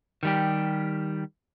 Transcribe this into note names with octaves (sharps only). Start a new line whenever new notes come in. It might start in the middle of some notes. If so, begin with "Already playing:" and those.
D#3 G3 G4